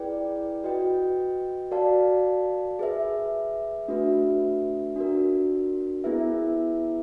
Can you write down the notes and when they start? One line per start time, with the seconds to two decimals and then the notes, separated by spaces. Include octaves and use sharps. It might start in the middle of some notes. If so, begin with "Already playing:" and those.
Already playing: E4 G#4 B4 D5 G5
0.64 F#4 B4 D#5 G5
1.71 F#4 A#4 D5 F5 A5
2.79 G#4 B4 E5
3.88 A3 D4 F#4 B4 E5
4.96 D4 F#4 A#4
6.04 B3 E4 G#4 B4 E5